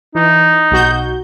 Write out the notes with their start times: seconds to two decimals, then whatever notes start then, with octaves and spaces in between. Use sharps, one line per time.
0.15 E3 D#4
0.71 B1 F#4 G6